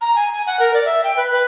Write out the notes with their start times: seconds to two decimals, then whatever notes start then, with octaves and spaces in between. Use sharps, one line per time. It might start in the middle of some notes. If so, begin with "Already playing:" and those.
0.01 A#5
0.16 G#5
0.33 G#5
0.47 F#5
0.60 A#4
0.74 D5
0.85 E5
1.04 G5
1.17 B4
1.31 B4